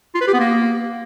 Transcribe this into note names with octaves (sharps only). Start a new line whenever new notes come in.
F4
B4
G4
B3
A#3